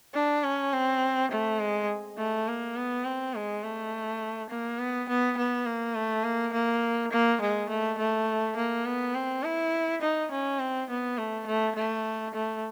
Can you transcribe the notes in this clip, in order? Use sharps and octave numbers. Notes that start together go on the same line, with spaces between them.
D4
C#4
C4
A3
G#3
A3
A#3
B3
C4
G#3
A3
A#3
B3
B3
B3
A#3
A3
A#3
A#3
A#3
G#3
A3
A3
A#3
B3
C4
E4
D#4
C#4
C4
B3
A3
A3
A3
A3